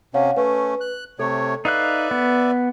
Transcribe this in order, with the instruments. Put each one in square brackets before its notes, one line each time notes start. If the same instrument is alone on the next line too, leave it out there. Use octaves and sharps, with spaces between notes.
[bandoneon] C3 C#4 [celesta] C#5 F5 F#5
[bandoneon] A3 C#4 [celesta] B4
[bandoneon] F#6
[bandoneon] C3 A3 C#5 [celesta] A4
[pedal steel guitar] D#4 F5 F#6 [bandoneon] B4 D5 E5
[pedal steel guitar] B3